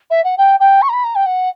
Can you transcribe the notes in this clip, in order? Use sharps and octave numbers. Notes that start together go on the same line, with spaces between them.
E5
F#5
G5
G5
C#6
A#5
B5
A#5
G5
F#5